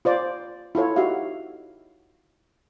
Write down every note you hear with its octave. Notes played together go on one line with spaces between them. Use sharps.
F4 C5 D5
E4 F4 A4 C#5
D#4 F#4 G4 E5 F5